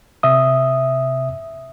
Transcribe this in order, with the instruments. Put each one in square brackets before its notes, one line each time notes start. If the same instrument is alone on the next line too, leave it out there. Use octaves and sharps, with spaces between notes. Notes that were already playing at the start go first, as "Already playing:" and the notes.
[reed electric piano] C3 E5 D#6